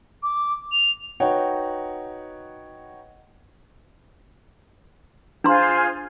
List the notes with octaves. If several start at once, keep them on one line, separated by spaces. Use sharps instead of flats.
D6
F7
D#4 F#4 B4 C#5 F#5 G5
D4 F4 G#4 C5 A#5 C6